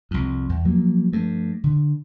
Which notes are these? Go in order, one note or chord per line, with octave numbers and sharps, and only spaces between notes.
C2 F2
E2
F3 F#3 A#3
G2 F3 A3
D3